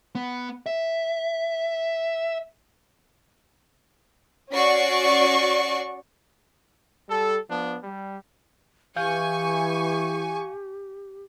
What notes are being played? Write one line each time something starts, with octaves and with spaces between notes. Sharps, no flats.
B3
E5
C#4 F#4 D5 C#6 C7
G3 A4
F3 B3 D4
G3
E3 G4 F5 G#5 C#6 G6